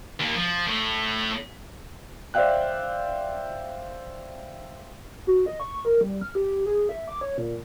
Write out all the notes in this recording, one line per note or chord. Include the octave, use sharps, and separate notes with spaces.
D#2 A#3
F3
A2 A3
C5 D5 E5 F5 G5 F#6
F#4
D#5
C#6
A#4
G3
F6
G4
G#4
E5
D6
C#5
A#2